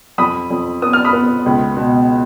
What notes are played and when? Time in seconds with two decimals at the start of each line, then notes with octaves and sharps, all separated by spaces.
0.18 F2 B5 D#6
0.50 F2
0.82 B3 D#6
0.93 F6
1.04 B5 D#6
1.13 B3
1.46 C#2
1.77 B2